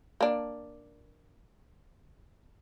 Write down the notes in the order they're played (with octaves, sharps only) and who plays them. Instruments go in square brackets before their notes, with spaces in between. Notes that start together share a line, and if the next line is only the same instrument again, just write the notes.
[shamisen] A#3 D4